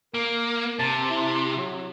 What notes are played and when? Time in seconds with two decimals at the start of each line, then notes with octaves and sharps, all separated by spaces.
0.14 A#3 A#4
0.79 C3 A5
1.10 E4
1.57 F#3